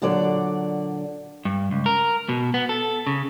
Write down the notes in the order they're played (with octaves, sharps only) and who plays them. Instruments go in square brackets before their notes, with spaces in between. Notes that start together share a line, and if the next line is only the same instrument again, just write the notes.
[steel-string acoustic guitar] A#2 D3 F#3 D5
[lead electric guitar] G2
C#2
A#4
B2
B3
A4
C#3